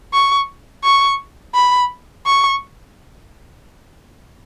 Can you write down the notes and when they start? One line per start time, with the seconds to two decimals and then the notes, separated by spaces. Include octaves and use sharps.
0.14 C#6
0.84 C#6
1.54 B5
2.26 C#6